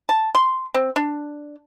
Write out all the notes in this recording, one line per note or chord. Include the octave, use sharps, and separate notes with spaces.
A5
C6
C4
D4